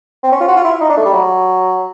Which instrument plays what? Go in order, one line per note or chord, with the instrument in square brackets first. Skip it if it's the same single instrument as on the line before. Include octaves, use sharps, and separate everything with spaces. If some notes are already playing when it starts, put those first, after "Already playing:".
[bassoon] C4
C#4
F4
F#4
F4
E4
D#4
D4
A3
G3
F#3